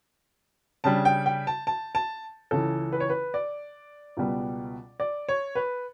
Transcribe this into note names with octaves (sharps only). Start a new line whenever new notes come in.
C#3 G3 D4 A5
G5
G5
A5
A5
A5
C#2 C#3 E3 A4
B4
C#5
B4
D5
C#2 B2 G3 B3
D5
C#5
B4